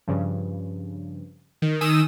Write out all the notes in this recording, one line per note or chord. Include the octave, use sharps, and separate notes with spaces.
G2 C#3 F3
D#3
D#3 G#5 D#6 E6